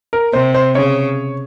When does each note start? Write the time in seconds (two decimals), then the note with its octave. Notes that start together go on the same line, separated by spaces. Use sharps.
0.13 A#4
0.33 C3 C5
0.54 C5
0.75 C#3 C#5